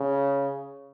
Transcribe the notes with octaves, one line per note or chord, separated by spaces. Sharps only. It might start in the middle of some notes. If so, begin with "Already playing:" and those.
Already playing: C#3